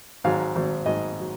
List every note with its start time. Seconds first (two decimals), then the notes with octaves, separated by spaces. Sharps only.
0.24 G#1 G#2 F#3 F5
0.56 G#1 G#2 F#3
0.86 G#1 G#2 F#3 D#5
1.20 F#3